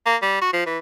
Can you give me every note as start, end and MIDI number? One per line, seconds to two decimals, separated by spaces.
0.06 0.16 58
0.22 0.38 55
0.41 0.50 66
0.53 0.63 53
0.66 0.78 52